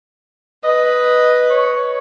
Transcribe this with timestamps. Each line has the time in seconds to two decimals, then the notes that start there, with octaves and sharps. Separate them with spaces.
0.64 B4 D#5
1.50 C#5